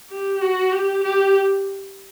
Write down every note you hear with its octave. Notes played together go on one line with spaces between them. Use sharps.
G4
F#4
G4
G4